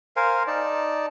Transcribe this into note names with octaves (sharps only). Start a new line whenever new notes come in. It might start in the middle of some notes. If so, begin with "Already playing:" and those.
A#4 C5 F5 G#5
D#4 D5 A5